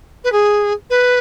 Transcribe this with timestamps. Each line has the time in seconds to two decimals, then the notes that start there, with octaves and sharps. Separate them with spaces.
0.24 B4
0.32 G#4
0.90 B4